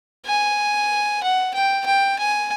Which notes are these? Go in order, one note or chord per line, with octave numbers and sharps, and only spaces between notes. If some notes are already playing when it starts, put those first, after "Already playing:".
G#5
F#5
G5
G5
G#5